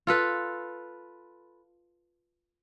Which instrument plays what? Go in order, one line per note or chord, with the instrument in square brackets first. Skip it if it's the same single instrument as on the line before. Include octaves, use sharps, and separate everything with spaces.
[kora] F4 A4 B4